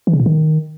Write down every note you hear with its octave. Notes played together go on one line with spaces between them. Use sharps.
E3
C#3
A#2
D#3